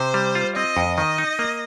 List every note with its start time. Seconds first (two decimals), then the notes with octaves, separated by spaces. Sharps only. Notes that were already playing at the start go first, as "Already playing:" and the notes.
Already playing: C3 C5
0.14 G3
0.35 F4
0.56 C4 D#5
0.77 F2
0.97 D#3 D#5
1.18 D#4
1.39 A#3